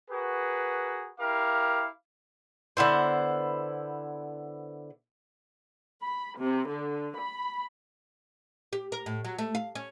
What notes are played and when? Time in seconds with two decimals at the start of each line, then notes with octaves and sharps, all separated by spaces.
0.11 F#4 G#4 A#4 B4
1.19 E4 G4 A#4 F5 D6
2.77 D3 B3 E4 C5
6.03 B5
6.37 C3
6.69 D3
7.18 B5
8.73 G4
8.92 A#4
9.06 A2
9.25 F#3
9.38 A3
9.55 F5
9.75 C#4